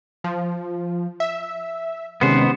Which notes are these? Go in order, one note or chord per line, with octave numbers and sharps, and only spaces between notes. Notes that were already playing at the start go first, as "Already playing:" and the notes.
F3
E5
C3 D#3 G#3 B3 C#4 C5